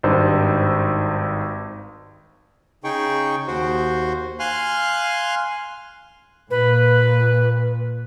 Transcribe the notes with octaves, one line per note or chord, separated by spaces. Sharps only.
G#1 G2 D#4 C5 E6
C#3 D#4 G#4 G5 C#6
D#2 F#4 C5
F5 G#5 C6 F6 F#6
A#2 B4